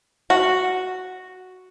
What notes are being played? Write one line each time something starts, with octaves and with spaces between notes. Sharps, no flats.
F#4